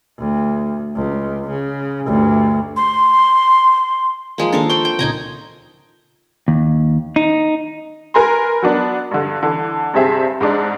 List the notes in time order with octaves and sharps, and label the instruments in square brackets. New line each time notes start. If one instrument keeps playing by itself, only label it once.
[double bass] D2
C#2
C#3
D2 G2
[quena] C6
[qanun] F3 G#3 A#3
[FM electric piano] D#3 A#3 D4 [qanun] A4 A#4 F5
[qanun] C5 G5 C6 [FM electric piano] C#6
[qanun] G5
[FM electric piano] C#2 A#2 C#3 [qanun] D#4 G#5 A#5
[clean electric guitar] D#2
D#4
[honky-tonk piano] A#4 B4 G#5 A#5 C6
F#3 B3 D4
G2 D3
D3 E3
G2 C3 C4 G#4 E5 A5
G#2 G#3 D4